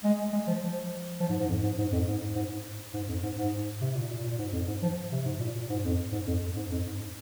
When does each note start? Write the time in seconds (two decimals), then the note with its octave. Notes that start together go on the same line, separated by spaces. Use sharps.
0.04 G#3
0.33 G#3
0.47 F3
0.62 F3
1.20 F3
1.29 G#2
1.39 G#2
1.49 F2
1.63 G#2
1.78 G#2
1.92 F2
2.07 G#2
2.35 G#2
2.94 G#2
3.08 F2
3.23 G#2
3.37 G#2
3.81 C3
3.95 A#2
4.10 A#2
4.24 A#2
4.38 G#2
4.53 F2
4.67 G#2
4.82 F3
5.12 C3
5.25 G#2
5.40 A#2
5.55 A#2
5.69 G#2
5.84 F2
6.12 G#2
6.27 F2
6.42 F2
6.56 G#2
6.71 F2
6.86 G#2